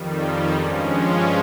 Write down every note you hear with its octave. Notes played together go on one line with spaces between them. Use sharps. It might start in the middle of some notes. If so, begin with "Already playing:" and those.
Already playing: F2 D#3 G3
G2 F3 G#3 C#4